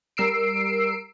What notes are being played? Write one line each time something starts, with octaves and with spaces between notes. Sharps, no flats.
G3 A#4 E6 C7 D7